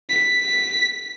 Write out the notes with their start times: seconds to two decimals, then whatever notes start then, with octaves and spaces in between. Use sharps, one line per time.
0.10 B6
0.42 B6